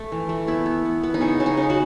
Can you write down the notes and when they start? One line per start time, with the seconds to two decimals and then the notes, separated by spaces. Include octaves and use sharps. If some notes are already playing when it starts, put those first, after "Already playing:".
Already playing: A3
0.12 E3
0.29 A3
0.48 B3 E4
0.66 B3
0.85 B3
1.03 B3
1.14 D#4
1.21 C#3 C#4
1.40 C#3
1.46 D#4
1.57 C#3
1.70 F#4